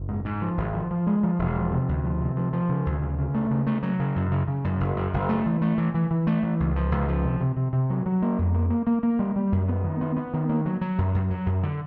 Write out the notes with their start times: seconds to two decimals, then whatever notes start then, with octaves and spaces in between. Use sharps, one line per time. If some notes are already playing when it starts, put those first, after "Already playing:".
Already playing: F#1
0.09 G#2
0.25 G#2
0.42 F3
0.58 G#1
0.74 F3
0.91 F3
1.07 G#3
1.23 F3
1.39 E1
1.56 F3
1.72 C3
1.89 D2
2.05 F3
2.20 C3
2.37 F3
2.53 F3
2.69 C#3
2.86 D2
3.02 C#3
3.19 C#3
3.35 A3
3.51 C#3
3.67 A3
3.83 F#3
4.00 C#3
4.16 F#2
4.32 C#3
4.48 C#3
4.64 F#2
4.80 F#1
4.96 F#2
5.14 F#1
5.29 A3
5.46 E3
5.62 A3
5.78 E3
5.94 E3
6.11 E3
6.27 A3
6.43 E3
6.60 C#2
6.76 F3
6.92 C#2
7.08 F3
7.24 C3
7.40 C3
7.57 C3
7.73 C3
7.90 F#3
8.06 F#3
8.22 A#3
8.38 F2
8.55 A#3
8.70 A#3
8.87 A#3
9.03 A#3
9.19 G3
9.36 G3
9.52 F#2
9.69 B3
9.84 D#3
10.01 B3
10.17 B3
10.34 D#3
10.49 A#3
10.66 F#3
10.81 F#3
10.98 F#2
11.15 F#2
11.30 F#3
11.46 F#2
11.63 D3